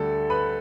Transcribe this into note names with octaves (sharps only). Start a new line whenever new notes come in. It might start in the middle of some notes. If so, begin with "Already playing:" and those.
Already playing: D2 D3 G3 A4
B4 B5